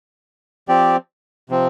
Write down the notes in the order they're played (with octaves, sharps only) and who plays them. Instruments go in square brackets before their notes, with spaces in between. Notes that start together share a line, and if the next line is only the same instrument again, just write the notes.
[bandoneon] F3 C4 G4 D5
C3 F3 C4